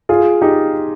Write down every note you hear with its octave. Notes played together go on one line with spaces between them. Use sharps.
F4 G#4
D#4 G4